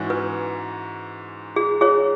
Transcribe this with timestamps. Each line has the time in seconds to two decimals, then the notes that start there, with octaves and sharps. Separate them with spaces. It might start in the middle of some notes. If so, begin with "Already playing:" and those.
Already playing: G#2 E3 C#4 F#4
0.10 B4
1.56 G#4
1.81 G#4 C#5